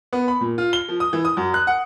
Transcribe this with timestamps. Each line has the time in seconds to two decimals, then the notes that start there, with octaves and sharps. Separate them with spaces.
0.13 B3
0.28 B5
0.41 A#2
0.58 F4
0.73 G7
0.89 F3
1.00 D#6
1.13 E3
1.25 D#6
1.37 F#2
1.54 F#6
1.67 F#5